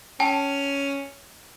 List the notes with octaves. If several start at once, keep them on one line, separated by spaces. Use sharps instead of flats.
C#4 G5 A5